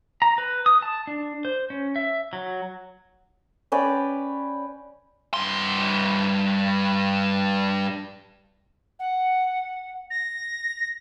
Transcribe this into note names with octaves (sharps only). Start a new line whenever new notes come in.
A#5
B4
D#6
A5
D4
C5
C#4
E5
F#3
C#4 B4 D5 G5
G2 C6
F#5
A#6